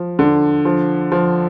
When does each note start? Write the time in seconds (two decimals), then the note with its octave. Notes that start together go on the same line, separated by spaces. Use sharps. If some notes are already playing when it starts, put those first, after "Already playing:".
Already playing: F3
0.19 D3
0.65 F3
1.12 F3